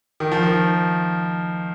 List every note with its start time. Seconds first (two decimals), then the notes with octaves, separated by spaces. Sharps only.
0.20 D#3
0.32 F3
0.43 D#3